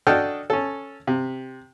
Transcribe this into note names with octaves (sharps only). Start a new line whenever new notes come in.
D4 F#4 A4 D#5 G5 F6
C#4 A4
C3